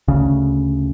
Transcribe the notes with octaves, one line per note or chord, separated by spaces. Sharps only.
D2 C#3